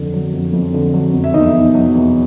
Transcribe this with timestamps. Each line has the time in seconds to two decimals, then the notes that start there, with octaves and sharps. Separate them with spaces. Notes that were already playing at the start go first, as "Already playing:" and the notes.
Already playing: F2 D3
0.14 F#3
0.33 F2
0.53 F2
0.74 D3
0.94 F#3
1.14 F2
1.24 E5
1.34 E2 D#4 D#5
1.54 B2
1.75 F#3
1.94 E2